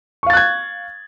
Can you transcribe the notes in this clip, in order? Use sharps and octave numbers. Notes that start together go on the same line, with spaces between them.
F5 C#6 F#6 G#6 A6